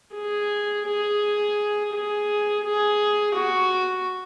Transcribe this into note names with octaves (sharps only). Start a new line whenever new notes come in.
G#4
G#4
G#4
G#4
F#4